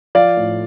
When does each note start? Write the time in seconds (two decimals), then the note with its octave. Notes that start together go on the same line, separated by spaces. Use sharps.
0.15 F3 D5 F5
0.37 A2